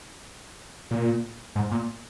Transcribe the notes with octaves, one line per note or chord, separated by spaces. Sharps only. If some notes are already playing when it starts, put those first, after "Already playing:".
A#2
G#2
A#2